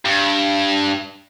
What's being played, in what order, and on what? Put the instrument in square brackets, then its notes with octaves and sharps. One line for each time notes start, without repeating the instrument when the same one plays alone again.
[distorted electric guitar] G2